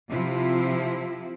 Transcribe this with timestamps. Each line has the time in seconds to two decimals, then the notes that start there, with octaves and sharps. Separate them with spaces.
0.11 C3 F3 E4